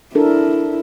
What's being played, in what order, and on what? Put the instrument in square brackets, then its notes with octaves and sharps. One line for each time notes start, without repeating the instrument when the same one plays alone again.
[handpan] D4 A4 A#4 [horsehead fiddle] E4